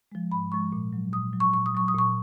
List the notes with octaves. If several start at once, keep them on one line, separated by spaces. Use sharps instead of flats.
F3 G#3
G#2 B5
F3 G#3 C#6
A#2
F#3
A#2 D#6
F#3
C#6
A#2 C#6
D#6
F#3 C#6
D#6
A#2 C#6